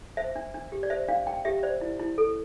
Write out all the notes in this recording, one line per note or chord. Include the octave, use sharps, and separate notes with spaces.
C5 E5
D4
D4
G4
D5
C5 E5
D4 F5
D4 G5
G4 E5
C5 D5
E4
E4
A4